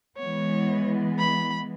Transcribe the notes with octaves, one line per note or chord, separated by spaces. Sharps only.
E3 G#3 B3 C#5
B5